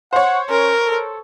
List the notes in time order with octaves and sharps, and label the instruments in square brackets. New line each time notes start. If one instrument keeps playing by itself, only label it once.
[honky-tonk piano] C5 C#5 [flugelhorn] F#5
[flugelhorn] C#4 [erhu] A#4
[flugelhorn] A4